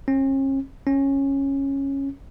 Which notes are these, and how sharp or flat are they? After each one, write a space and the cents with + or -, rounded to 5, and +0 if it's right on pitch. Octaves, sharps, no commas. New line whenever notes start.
C#4 -40
C#4 -10